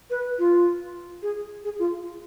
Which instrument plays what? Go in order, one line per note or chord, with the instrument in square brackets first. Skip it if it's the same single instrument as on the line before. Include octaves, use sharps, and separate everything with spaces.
[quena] B4
F4
G#4
G#4
F4